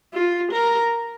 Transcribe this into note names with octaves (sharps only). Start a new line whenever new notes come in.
F4
A#4